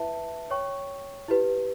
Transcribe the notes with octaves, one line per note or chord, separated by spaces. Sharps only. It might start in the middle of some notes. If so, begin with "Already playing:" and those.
Already playing: E4 B4 E5 A5
C#5 G5 C#6
E4 G4 B4